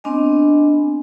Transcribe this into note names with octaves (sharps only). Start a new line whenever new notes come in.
B3 C4 D4 D#5 G#5